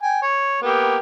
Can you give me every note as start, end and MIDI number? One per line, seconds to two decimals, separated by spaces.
0.02 0.21 79
0.02 0.21 80
0.22 0.61 73
0.62 0.98 58
0.62 0.98 59
0.62 0.98 67